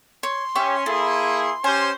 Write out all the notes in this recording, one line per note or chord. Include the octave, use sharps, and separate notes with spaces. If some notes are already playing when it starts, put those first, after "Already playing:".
C#5 C6
C#4 G4 E5 C#6
A#3 E4 G#4 A4
C#4 G4 C5 G#5